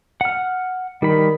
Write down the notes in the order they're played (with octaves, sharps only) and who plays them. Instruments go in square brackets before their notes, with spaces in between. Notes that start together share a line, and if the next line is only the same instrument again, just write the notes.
[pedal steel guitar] F#5 F6
[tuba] D#3 [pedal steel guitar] G3 B5